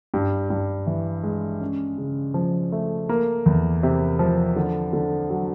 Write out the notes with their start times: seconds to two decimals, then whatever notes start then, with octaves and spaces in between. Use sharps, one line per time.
0.14 G2
0.50 G2
0.87 E3
1.23 G#3
1.61 C#4
1.98 C#3
2.34 F3
2.72 A3
3.09 A#3
3.46 E2
3.83 C3
4.19 F3
4.56 D3
4.93 D3
5.30 F#3